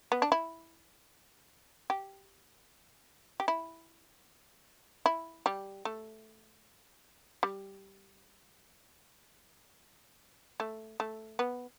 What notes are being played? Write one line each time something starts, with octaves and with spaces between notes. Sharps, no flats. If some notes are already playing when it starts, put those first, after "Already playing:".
B3
D4
E4
G4
G4
E4
E4
G3
A3
G3
A3
A3
B3